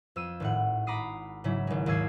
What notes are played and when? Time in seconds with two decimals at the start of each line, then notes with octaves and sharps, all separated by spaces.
0.16 F2 E6 D#7
0.40 G#1 A2 F#5
0.87 A#5 B5 D6 D#6 C7
1.44 G#2 C#3 F#3 E4
1.67 G#1 G#3
1.86 D#2 G#2 D#5 E6 G#6 C7